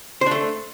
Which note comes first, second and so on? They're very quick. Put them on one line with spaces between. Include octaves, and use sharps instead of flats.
C5 D4 A3